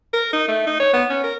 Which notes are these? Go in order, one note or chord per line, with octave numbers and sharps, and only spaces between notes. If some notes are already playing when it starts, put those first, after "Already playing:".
A#4
D#4
A3
D#4
C#5
B3
C#4
A#4